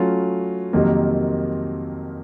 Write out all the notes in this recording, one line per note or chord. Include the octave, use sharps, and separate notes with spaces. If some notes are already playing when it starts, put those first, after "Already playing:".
Already playing: F#3 A3 C#4 F4
F2 C3 D#3 F#3 A#3